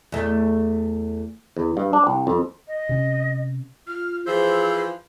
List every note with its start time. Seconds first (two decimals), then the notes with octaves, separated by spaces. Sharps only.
0.12 E2 A3
1.57 E2
1.77 G2
1.93 D4
2.07 C2
2.27 F2
2.67 D#5
2.89 C3 C#4
3.87 F4 F6
4.27 E3 F3 G#4 C5 E6